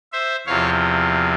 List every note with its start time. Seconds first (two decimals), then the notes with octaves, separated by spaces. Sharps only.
0.12 C5 E5
0.46 E2 C3 F3 C#5 F5